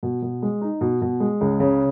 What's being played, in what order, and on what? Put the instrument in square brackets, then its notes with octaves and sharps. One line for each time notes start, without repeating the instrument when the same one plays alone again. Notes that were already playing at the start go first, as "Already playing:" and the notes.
[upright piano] B2
B2
G#3
D#4
B2
B2
G#3
C#2
C#3